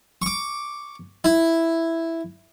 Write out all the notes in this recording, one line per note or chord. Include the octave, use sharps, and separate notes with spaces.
C#6 D6
E4